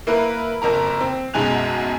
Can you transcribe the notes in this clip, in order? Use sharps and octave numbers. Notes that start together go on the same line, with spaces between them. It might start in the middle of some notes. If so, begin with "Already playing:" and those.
A#3 E4 A#4 B4
F#1 F2 A#4 A#5
C4
B1 F#2 G#3 G#5 F#6 F7